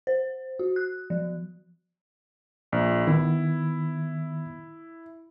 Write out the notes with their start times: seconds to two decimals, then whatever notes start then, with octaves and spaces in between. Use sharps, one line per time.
0.07 C5
0.59 F#4
0.76 F#6
1.10 F3
2.72 A#1
3.07 D#3 B3 E4